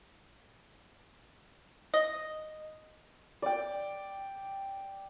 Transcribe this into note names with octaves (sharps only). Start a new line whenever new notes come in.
D#5
D5 G5